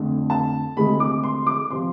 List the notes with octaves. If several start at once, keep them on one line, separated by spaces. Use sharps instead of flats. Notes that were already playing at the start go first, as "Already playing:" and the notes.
Already playing: F2 D3 A3
A5
D2 C3 G#3 B5
D6
C6
D6
C3 F3 C6